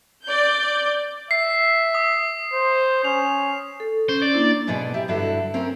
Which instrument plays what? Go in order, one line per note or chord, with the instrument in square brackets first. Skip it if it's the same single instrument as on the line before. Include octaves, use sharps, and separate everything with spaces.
[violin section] D5 G6
[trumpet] E5 [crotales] C7
[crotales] D#6
[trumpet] C5
[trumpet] C#4 [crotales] F7
[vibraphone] A4
[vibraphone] C#4 [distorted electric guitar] C5
[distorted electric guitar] D5
[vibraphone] A#3 D4 E4
[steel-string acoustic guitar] G#2 B2 B3 G#4 D5
G4 E5
G2 D3 E4 F#4 A4
C4 C#4 A#4